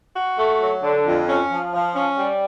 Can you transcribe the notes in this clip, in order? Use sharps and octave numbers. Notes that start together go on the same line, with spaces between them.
F#4
A3
F#3
D3
F2
C#4
F3
F3
C#4
G3